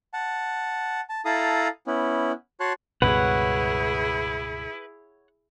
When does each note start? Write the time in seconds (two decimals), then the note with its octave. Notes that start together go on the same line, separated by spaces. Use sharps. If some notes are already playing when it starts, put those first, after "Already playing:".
0.14 F#5 A5
1.10 A5
1.25 E4 A4 F5 A5 A#5 D#6
1.87 B3 C#4 E4
2.60 F#4 C#5 A5 C6 F#6
3.02 C#2 G2 B2 E4 G#4 B4 C#5 F#5